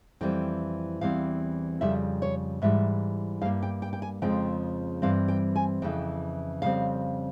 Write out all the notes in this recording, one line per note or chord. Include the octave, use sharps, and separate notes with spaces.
F2 E3 G3 C4 G5
E2 E3 G3 C4 F5
F2 C#3 G3 E5
C#5
G#2 E3 G3 E5
G2 G3 A#3 F5
G5
G5
G5
G#5
F2 C#3 F3 G#3 C4 G5
G2 E3 G3 C4 F5
G5
G#5
F2 C#3 E3 G5
F2 C#3 G3 C4 F5